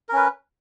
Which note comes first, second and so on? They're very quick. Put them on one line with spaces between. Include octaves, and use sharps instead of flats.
A#4 C#4 B4